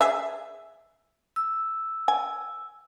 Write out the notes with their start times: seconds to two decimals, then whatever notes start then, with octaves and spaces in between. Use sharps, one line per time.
0.01 G#4 E5
1.36 E6
2.08 G#5